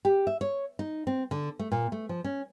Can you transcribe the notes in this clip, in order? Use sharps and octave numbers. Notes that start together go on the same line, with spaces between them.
G4
E5
C#5
D#4
C4
D3
A3
A#2
A3
F3
C#4